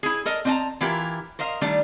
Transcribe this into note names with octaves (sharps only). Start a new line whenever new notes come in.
E4 G#4
A4 A#4 D#5
C4 D4 D#5 F#5 A5 A#5
E3 E4 F4 G4 A#4
A#4 C5 D#5 F5
D#3 G3 A3 D4